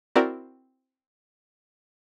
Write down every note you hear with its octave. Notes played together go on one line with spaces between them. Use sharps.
C4 E4 F#4 A#4 D5